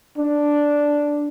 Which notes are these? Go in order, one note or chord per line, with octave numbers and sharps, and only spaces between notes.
D4